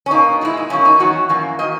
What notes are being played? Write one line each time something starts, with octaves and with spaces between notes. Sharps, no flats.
C#4
B2 A#3 D#4
A#2 G#3 E4
D#4
B2 F#3 A#3 C#4
D#4
E2 D#3 F#3 F#4
F#2 E3 A#3
D#3 A#3 D#5